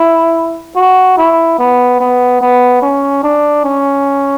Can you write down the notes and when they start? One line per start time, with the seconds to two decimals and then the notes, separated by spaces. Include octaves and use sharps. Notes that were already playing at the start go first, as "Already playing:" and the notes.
Already playing: E4
0.76 F#4
1.18 E4
1.59 B3
2.00 B3
2.41 B3
2.82 C#4
3.23 D4
3.64 C#4